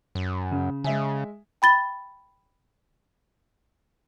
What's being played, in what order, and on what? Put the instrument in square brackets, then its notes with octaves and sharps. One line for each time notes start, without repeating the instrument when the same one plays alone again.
[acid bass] F#2
[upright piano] C#3
[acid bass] C#3 [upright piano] G#3 E5 G#5
[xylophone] G5 B5 A6 G7